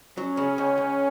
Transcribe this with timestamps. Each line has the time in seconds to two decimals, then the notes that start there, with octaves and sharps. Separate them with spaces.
0.17 F#3 C#4
0.37 C#3
0.58 C#2
0.78 C#2